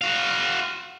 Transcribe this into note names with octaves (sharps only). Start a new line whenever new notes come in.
F#4 F5